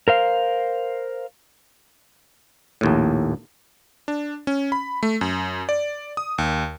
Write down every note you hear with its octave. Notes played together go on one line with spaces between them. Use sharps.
A#4 C5 F5
A#1 D#2 A2
D4
C#4
B5
A3
F#2
D5
D#6
D#2